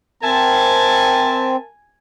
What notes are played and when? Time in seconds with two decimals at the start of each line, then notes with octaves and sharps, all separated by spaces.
0.23 C4 A#4 E5 G#5 A5